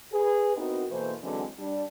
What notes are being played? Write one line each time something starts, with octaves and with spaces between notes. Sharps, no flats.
G#4 B4
B3 C4 D#4 E4 F#4 A#4
B2 E3 A3 A#3 C5
D3 E3 F#3 G#3 C4 C#4
G3 D4